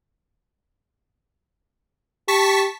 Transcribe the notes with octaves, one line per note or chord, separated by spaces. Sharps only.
G4 A5 C#6 B6